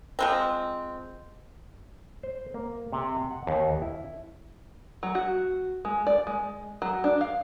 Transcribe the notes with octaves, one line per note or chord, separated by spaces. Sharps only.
F3 G#3 C4
C5
A#3
C3
F#5
D#2
E4
F#3
F#4
G#3
D5
G#3
F#3
D4
F5